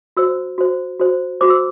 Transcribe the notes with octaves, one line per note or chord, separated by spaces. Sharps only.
F#4 C5 E6
F#4 C5
F#4 C5
F#4 C5 D6
E6